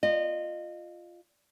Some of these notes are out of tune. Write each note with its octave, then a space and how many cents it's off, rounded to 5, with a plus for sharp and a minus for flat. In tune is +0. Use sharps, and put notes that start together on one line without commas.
F4 +0 D#5 -25